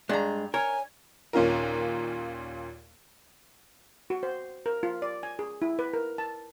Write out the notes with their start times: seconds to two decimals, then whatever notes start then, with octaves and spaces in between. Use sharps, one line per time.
0.09 G2 G#3 D4 A#5
0.54 A#4 C#5 G#5
1.33 D#2 A#2 C#4 F4 A#4
4.10 F#4
4.23 C5
4.66 A#4
4.83 F4
5.02 D5
5.23 G#5
5.39 G#4
5.62 E4
5.79 B4
5.94 A#4
6.18 A5